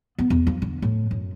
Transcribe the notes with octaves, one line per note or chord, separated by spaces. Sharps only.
B3
E2
F3
D3
A2
F#2